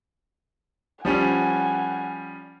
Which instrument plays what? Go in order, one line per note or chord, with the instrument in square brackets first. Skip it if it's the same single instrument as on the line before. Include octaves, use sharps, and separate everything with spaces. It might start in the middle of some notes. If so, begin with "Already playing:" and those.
[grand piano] F3 G3 C#4 [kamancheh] F#5 G#5